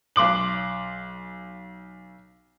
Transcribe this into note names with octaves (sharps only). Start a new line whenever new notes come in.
B1 C6 D6 F#7